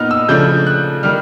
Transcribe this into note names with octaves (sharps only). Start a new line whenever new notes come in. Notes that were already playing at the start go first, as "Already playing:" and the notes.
Already playing: A#2 B3 D#4 F6
E6
C#3 F3 A3 D4 G6
F#6
D#3 G3 F6